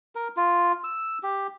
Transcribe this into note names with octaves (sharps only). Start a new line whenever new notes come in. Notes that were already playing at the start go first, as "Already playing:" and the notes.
A#4
F4
E6
G4